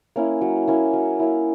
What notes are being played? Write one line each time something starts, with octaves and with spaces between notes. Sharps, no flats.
A#3 C#4 E4
F#3
A#3 C#4 E4
F#3
A#3 C#4 E4